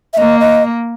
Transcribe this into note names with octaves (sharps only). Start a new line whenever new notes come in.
E5
A#3 D#5
D#5